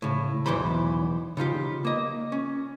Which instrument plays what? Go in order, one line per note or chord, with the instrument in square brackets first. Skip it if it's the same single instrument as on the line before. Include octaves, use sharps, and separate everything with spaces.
[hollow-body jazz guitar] A2 C#3
B1 E2 E3 C5 B5
C#3 D#4 F4 G4
A#3 D#5
C#4